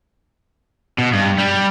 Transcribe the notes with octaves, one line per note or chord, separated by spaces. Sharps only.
B2
G2
G3